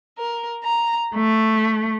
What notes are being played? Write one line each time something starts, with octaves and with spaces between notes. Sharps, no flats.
A#4
A#5
A3